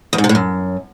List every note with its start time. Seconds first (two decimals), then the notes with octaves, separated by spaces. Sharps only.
0.13 E2
0.18 G#2
0.24 C3
0.29 A2
0.35 F#2